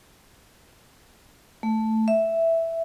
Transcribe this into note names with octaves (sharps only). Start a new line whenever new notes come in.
A3
E5